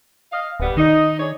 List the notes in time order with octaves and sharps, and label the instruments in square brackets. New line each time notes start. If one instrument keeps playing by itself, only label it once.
[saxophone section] D#5 F5
[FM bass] D1 [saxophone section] G3 B3
[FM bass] D#3 [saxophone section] D#4
[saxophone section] D4 G#4 C#5